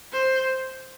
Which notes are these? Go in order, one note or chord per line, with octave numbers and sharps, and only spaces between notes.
C5